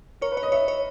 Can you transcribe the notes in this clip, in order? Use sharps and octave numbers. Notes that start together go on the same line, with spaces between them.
A#4 C#5
B4
C#5
D#5
C#5 E5
C#5